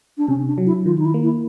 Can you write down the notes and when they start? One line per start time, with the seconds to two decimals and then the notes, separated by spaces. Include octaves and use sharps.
0.18 D4
0.28 C3 C#4
0.47 D4
0.58 F#3
0.66 E4
0.86 D#3 F4
0.98 D#4
1.05 E4
1.14 A#3
1.24 E4